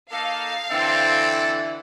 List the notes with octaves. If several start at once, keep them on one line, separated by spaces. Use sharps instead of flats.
A#3 D#4 A4 F5
D3 E3 C4 E4 A4